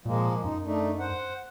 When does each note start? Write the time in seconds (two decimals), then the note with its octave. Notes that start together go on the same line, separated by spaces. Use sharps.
0.05 A#2 F3 G#3 A#3
0.44 F#2 D#4
0.64 A3 D4 D#4
1.00 C5 F#5